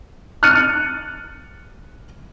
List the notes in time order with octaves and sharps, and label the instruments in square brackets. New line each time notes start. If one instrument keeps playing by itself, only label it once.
[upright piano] F6 F#6 A6 C#7 D#7